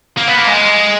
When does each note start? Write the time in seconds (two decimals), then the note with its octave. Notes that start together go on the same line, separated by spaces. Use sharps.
0.17 A#3
0.28 B3
0.37 A#3
0.47 G#3